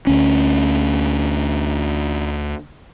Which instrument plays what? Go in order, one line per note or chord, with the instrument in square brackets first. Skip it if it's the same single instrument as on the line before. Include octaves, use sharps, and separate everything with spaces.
[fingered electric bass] D2 C#4